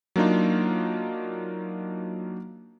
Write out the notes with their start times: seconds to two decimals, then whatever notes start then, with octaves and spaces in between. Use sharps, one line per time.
0.16 F#3 A#3 D4 D#4 F4